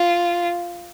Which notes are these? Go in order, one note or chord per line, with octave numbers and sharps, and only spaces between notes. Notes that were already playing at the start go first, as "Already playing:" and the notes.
Already playing: F4